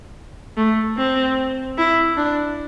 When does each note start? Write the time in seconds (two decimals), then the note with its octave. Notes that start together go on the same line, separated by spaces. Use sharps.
0.57 A3
0.97 C4
1.78 E4
2.17 D4